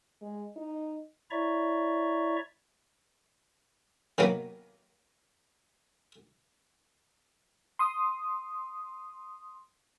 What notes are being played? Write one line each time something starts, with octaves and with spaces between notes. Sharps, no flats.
G#3
D#4
E4 C#5 D5 E5 A#5 C#6
D#3 F#3 A#3 B3
C6 D#6